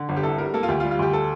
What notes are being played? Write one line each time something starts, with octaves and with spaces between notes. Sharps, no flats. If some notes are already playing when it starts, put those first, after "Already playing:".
Already playing: D3
G1
G4
C2 A4
G3 A#4
A#3 A4
F4
D2 G4
F4
G3
F4
D2 G4
A4